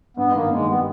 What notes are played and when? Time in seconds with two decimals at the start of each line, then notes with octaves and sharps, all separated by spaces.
0.17 G2 B3
0.28 G#3
0.34 D#3 A#3
0.51 D#3 G#3
0.68 G3 B3